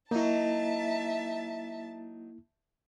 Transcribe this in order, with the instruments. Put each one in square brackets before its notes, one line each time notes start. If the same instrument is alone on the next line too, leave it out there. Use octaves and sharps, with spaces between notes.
[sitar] F#3 D#4 [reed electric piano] A#3 E4 [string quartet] E5 A5